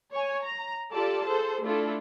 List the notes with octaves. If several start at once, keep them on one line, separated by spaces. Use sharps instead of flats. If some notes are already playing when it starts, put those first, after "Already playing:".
C#5 G#5
A#5
F4 G4 A4 D5 A5
G#4 A4 C5
A3 D4 E4 F4 A4